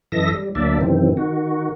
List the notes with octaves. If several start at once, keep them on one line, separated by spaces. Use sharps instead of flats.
F#2 E3 A4 D#5 E5 A#6
G3
D2 F#3 A#3 D4 D5 E5
F#2 C3 D#3 E3 C4
D#3 F#4